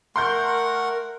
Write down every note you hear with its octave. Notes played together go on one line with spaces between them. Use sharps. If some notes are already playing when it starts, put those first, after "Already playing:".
A3 A#4 F#5 C6 G6